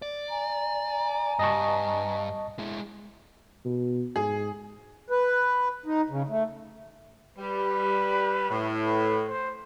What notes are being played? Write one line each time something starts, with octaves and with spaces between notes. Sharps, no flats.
D5
G#5 A#5
G2 D#5 A5 C#6
G#3 E4
B2
G#2 G#4
B4
D#4
C#3
A3
G3 B4
A2
B4
C5